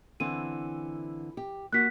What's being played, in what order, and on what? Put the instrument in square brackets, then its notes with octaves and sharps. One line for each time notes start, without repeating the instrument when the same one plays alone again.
[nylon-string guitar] D3 E3 C4 [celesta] D#7
[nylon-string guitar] G4
[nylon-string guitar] A#3 F#4 [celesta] F#6 B6